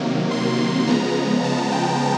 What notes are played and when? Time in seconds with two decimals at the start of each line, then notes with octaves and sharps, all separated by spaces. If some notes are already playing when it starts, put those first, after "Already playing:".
Already playing: C3 D#3 F#3 A#3
0.31 C6
0.87 C#3 F3 G#3 B3 A#5
1.44 A5
1.71 G5